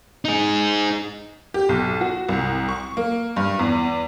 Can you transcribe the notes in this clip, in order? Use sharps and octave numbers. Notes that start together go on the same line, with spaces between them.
D#4 G#4
G4
B1
F#4
C2
C#6
A#3
G2
E2